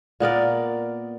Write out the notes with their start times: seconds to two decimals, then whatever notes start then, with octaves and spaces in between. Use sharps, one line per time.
0.20 A#2 B3 A#4 D5